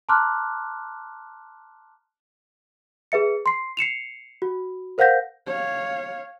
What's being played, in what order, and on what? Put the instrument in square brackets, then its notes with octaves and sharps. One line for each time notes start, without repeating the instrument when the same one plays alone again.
[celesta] A5 A#5 C6 D6 F6 F#6
G#4 B4 E5 C#7
C6 C7
C7 C#7 E7 F7
F#4
A#4 C5 F5 F#5 G6 A#6
[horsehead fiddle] C#5 F5